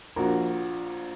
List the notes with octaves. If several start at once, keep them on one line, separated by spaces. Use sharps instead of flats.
A#1 A#2 F#4 A#4